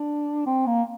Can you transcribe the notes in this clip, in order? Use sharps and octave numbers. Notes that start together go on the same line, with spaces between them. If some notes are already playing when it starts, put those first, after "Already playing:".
Already playing: D4
C4
A#3